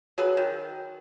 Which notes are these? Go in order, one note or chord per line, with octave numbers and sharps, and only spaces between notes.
F#3 G#4 B4
D#3